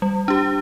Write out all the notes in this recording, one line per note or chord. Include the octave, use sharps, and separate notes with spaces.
G3
D4 G4